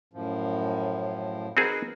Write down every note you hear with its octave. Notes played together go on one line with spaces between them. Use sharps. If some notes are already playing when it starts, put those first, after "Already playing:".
F#2 A2 F3
C4 D#4 F#4 G#4 A#4 B4